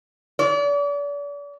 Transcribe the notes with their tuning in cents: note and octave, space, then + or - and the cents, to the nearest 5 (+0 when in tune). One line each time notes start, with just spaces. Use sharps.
D5 -40